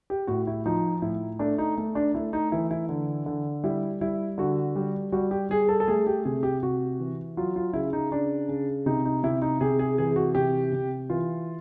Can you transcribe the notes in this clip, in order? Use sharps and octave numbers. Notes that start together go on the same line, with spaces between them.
G4
A2 F#4
E4
F3 D#4
A2 E4
A3 D4
D#4
A3
D4
A3 E4
D#4
E3 E4
E4
D3
D3
G3 E4
G3 E4
D3 F#4
G3
G3 F#4
G4
G3 G#4
A4
A4
A3 G#4
G4
C3 G#4
G4
C3 F#4
E3
F#3 F4
F4
C#3 E4
D#4
C#3 D4
C#3
C3 D#4
D#4
C3 E4
D#4
C3 G#4
G#4
E3 G#4
F#4
C3 G4
C3
E3 F4